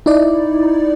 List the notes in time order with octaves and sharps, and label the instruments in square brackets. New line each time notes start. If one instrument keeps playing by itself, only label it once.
[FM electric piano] D#4 E4 D5